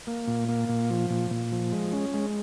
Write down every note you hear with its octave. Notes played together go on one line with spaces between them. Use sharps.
A#3
A#2
A#3
A#2
F3
A#2
A#2
F3
G#3
C#4
G#3